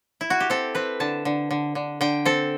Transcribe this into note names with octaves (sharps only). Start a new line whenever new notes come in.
E4
F#4
G4
C4 A4
C4 B4
D3 A5
D3
D3
D3
D3 G5
C4 A4